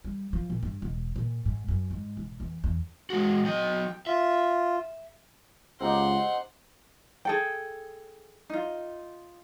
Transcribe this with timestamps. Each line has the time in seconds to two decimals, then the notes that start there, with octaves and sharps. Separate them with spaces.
0.04 G3
0.33 F3
0.50 A#2
0.63 G2
0.82 E1
1.16 A#2
1.45 G#2
1.68 F#2
1.91 G#2
2.17 E1
2.40 E2
2.64 E2
3.10 G#3 F#4
3.44 F#3 D#5 G5
4.07 F4 E5
5.80 C#2 C4 D#4 G4 F#5 C6
7.25 G#4 A4 G5
8.50 D#4 F4